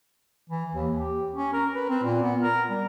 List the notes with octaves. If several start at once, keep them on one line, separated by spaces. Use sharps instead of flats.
E3
D#2
G4
C#4
A#4
B4
C4
A#2
B3
A#4
G3